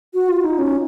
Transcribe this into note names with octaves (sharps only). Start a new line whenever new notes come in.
F#4
F4
D#4
C#4